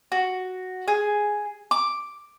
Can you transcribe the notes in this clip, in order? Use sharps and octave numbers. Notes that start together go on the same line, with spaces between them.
F#4
G#4
D6